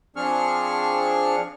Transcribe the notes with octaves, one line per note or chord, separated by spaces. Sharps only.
F3 C4 D4 G#4 C#6 F6